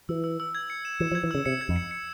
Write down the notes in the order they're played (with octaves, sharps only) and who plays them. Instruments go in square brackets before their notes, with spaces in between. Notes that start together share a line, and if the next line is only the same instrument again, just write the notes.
[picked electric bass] E3 [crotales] E6
[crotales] E6
E6
G#6
C#7
E7
[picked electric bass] E3 [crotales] E7
[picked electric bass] F3
[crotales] G#6
[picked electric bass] E3
[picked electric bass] C#3 [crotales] E6
[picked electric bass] C3 [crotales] C#7
[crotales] G#6
[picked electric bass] F2
[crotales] C#7
C#7